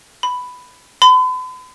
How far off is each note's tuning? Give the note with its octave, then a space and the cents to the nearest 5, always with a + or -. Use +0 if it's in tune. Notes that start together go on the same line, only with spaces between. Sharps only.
B5 +10
B5 +45